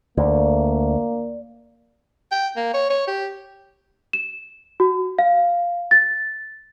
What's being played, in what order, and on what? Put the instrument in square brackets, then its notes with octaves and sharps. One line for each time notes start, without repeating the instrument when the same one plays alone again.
[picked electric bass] D2 [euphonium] A#3 [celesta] D5
[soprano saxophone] G5
A#3
C#5
C#5
G4
[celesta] E7
F#4
F5
A6